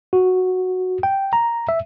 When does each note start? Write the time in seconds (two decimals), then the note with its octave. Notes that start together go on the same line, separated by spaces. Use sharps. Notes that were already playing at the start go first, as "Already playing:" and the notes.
0.13 F#4
1.03 G5
1.33 A#5
1.69 E5